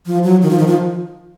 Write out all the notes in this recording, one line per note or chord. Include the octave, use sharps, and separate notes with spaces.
F3
F#3
D#3
F3
D#3
F3